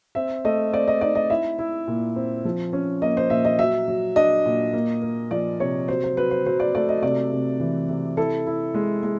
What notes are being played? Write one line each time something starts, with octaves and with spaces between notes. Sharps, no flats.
C4 E5
A3 D#5
C4 D5
D#5
D#4 D5
D#5
E4 E5
E4
A#2
C4
F3
C#4
A#3 D#5
C5
A#2 E5
D#5
F#3 E5
F#3
D4 D#5
A#2
A#3
A#3
F3 D5
C3 C#5
F#3 C5
C5
F#3 B4
C5
F#3 C5
D5
A3 D5
D#5
C3 D5
C3
E3
C3
E4 A4
E4
G#3
G#3